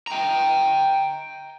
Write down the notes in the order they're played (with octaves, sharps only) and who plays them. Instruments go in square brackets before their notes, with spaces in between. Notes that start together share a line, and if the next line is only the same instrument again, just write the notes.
[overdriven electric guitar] G5 A#5